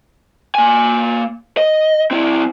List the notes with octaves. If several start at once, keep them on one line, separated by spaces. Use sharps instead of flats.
A#3 G#5
D#5
C4 E4